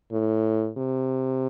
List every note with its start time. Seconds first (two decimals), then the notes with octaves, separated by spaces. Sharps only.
0.12 A2
0.78 C3